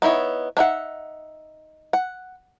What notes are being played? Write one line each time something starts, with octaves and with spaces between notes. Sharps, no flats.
B3 D#4 E4 C#5
D4 D#4 E5 F#5
F#5